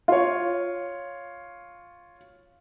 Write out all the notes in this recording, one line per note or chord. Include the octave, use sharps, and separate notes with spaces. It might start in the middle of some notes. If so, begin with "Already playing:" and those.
F4 C#5